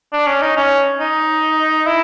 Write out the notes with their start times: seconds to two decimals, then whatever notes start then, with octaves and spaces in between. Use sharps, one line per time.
0.13 D4
0.27 C#4
0.41 D#4
0.57 C#4
1.00 D#4
1.87 E4